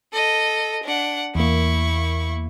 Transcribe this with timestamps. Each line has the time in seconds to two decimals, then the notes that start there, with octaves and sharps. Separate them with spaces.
0.13 A4 D#5
0.83 D4 F#5
1.35 E2 A#3 E4 C#6